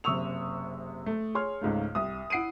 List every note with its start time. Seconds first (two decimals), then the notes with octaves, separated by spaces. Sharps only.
0.04 F#1 C3 C#6 D#6 E6 F7
1.06 A3
1.35 G#4 C#5 C6 F6
1.61 C#2 G#2 C#3 A3
1.95 C2 D#6
2.30 E4 F#5 C7 D7 D#7